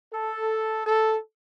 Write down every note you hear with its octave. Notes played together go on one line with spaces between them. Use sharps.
A4
A4